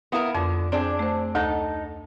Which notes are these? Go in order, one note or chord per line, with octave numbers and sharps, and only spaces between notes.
B3 E4 A#4 F5 D#6
F2 D3
C4 D4 G#4 D5
A3 C5
D2 D#4 A4